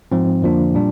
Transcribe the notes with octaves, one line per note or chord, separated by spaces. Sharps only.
G#2 F3 C4
F2 D3 F3 A#3 D4
A#2 G3 D4